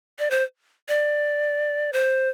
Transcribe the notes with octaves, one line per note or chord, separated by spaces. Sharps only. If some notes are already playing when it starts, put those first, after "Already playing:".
D5
C5
D5
C5